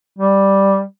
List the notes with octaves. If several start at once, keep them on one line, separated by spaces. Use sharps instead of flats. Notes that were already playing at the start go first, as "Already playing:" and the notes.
G3